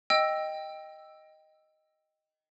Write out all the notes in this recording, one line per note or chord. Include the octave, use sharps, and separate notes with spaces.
D#5 G5 E6